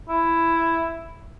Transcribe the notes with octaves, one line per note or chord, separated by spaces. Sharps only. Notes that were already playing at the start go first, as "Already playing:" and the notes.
E4